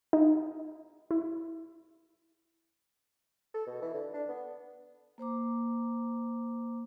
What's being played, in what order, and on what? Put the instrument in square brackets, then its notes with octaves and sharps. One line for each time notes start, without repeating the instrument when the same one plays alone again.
[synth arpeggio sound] D#4
E4
[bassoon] A4
B2
E3
D3
D4
B3
[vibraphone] A#3 C5 A#5 D6